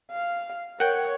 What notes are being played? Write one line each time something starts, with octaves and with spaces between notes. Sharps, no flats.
F5
A#4 C#5 F#5 G5